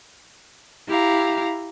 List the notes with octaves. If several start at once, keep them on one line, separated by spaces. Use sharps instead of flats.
E4 G4 F5 A#5